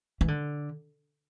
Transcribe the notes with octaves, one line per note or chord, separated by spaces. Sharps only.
E3
D3